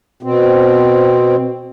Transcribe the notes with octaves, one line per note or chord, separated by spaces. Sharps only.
B2 C4